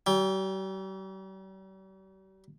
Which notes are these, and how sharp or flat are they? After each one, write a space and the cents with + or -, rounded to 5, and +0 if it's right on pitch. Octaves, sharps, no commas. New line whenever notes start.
G3 -45 G5 +20